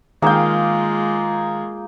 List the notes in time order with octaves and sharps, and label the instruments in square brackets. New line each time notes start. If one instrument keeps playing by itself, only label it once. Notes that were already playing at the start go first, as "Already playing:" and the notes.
[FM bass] D#3 [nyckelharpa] G#3 F4 [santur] A#3 G5 [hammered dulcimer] G#4 F5